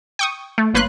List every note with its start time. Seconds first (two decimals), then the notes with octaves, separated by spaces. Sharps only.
0.19 G5 C#6 D#6
0.58 A3
0.74 G1 A#3 B4 C#5 C6 F#6